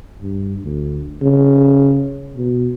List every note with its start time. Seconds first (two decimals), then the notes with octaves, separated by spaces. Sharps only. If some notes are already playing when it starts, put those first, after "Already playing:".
0.22 G2
0.64 D2
1.22 C#3
2.36 B2